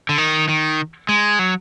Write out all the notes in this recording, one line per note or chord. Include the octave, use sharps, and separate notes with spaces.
D3
D#3
D#3
G#3
F#3